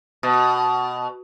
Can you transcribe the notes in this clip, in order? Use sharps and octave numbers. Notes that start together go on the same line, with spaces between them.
B2